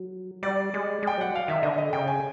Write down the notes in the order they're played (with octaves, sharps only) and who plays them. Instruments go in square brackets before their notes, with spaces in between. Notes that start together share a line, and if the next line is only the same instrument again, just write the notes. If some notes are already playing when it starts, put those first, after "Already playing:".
Already playing: [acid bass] F#3
[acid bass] G3 [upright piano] D5
[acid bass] G#3
[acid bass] G#3 [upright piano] G5
[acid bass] F#3 [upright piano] F#5
[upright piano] F5
[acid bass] D#3 [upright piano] E5
[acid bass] D3 [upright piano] D#5
[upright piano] D#5
[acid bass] C#3 [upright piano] G5
[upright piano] G#5